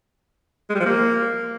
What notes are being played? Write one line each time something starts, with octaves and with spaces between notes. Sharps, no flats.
G#3
G3
F3
A#3